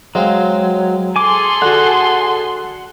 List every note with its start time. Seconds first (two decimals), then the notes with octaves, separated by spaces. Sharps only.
0.15 F#3 G#3 C4 F5
1.16 G#4 A4 G#5 C6 D6
1.62 D3 F#4 F#5